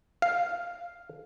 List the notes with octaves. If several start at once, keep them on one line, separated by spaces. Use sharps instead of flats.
F5